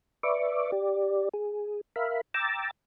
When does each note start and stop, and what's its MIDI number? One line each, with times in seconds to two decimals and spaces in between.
0.23 0.71 71
0.23 0.71 74
0.23 0.71 76
0.23 0.71 85
0.23 0.71 86
0.72 1.29 67
0.72 1.29 74
1.34 1.81 68
1.96 2.21 70
1.96 2.21 76
1.96 2.21 77
1.96 2.21 83
2.34 2.71 79
2.34 2.71 82
2.34 2.71 86
2.34 2.71 88
2.34 2.71 93